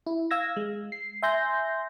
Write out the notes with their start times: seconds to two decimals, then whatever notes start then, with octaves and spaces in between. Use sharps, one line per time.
0.06 E4
0.31 F5 E6 G#6 A#6
0.56 G#3
0.92 C7
1.22 E5 G#5 C6 G6 A#6